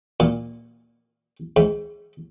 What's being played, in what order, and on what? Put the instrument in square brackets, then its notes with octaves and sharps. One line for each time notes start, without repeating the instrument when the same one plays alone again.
[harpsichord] A#2
G#2